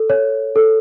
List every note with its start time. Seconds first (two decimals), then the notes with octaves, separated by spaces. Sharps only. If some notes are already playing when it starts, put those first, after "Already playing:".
Already playing: A4
0.10 C#5
0.56 A4